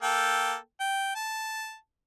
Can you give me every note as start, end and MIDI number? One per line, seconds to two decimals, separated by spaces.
0.02 0.55 58
0.02 0.55 69
0.02 0.55 79
0.80 1.11 79
1.15 1.76 81